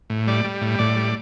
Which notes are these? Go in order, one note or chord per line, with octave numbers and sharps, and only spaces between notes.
A2
G3 D5
G3
A2
A2 D5
G3